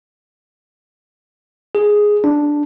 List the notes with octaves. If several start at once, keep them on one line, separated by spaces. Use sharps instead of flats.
G#4
D4